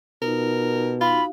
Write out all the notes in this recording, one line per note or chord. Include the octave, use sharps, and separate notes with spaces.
B2 D#4 F4 A#4
D#4 F4 F#4 F5 B5